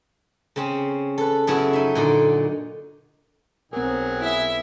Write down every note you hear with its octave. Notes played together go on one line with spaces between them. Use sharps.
C#3 C4 C#4
A4 B4
F#2 C#3 B3 E4 F#4
D#4 E5
A#2 D3 D#4
B1 F#3 C4 G#4 A#4
E4 E5